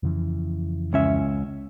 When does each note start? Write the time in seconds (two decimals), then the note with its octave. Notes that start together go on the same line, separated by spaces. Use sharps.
0.03 F2 C#3 E3
0.93 C#2 C#4 E5